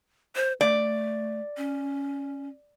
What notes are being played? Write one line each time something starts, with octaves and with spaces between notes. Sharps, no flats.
C5
A3 D5
C#4